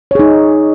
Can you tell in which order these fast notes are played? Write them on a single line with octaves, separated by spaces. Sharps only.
C#5 G#4 D#4